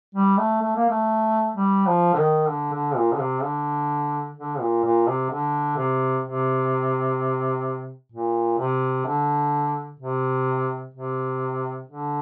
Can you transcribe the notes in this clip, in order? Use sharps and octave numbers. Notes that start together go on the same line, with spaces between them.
G3
A3
A3
A#3
A3
G3
F3
D3
D#3
D3
D3
A#2
D3
C3
D3
D3
A#2
A#2
C3
D3
C3
C3
A#2
C3
D3
C3
C3
D3